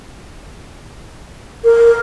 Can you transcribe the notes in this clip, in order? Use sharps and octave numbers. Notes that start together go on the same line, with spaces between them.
A#4